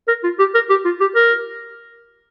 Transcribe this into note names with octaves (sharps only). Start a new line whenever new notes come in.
A#4
F4
G4
A#4
G4
F4
G4
A#4